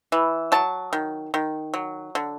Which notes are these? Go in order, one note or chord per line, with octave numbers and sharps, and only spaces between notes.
E3
F#3 A5
D#3
D#3
F#3
D3